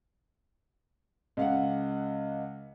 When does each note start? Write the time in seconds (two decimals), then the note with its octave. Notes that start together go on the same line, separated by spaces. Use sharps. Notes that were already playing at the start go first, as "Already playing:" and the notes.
1.37 C#2 F5 F#5